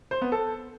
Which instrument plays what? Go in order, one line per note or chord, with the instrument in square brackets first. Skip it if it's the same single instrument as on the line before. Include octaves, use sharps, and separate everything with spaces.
[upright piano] C5
B3
A4